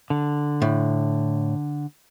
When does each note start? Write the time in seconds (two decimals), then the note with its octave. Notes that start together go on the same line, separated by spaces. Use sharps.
0.10 D3
0.62 A2